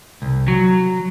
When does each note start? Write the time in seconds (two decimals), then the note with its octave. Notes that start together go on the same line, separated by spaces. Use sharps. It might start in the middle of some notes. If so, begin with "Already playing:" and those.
0.22 C2
0.48 F#3